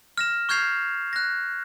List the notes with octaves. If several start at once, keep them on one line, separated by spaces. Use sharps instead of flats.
F6 A#6 E7
C#6 F6 G6 G#6 C7 F7
F#6 A#6